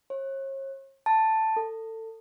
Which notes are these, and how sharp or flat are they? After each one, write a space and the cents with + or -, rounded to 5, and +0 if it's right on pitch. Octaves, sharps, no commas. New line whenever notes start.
C#5 -40
A5 +5
A4 +25